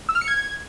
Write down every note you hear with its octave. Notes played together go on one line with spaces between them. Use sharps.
E6
F6
C#7
G#6